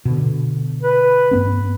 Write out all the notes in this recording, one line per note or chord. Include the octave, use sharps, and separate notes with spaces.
B2 D3
B4
G2 B3 C#4